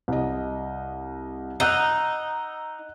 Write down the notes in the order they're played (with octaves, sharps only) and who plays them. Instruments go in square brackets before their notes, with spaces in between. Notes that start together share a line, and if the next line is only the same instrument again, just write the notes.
[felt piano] C2 D#5
[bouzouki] D#4 [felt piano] F#5 E6 F#6